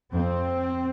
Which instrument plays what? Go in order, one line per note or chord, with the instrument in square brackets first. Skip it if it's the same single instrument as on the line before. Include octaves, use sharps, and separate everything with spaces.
[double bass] F2 [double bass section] C4